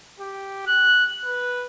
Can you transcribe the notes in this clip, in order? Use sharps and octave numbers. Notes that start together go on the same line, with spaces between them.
G4
F#6
B4